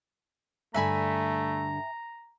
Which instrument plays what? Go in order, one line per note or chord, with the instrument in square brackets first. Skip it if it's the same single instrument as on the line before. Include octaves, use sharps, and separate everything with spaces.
[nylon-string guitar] G2 D3 [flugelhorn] A3 [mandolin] E5 G#5 B5 [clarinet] A#5